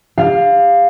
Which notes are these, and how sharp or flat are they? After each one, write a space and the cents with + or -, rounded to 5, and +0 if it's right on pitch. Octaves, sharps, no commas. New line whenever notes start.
G4 +35 F5 +0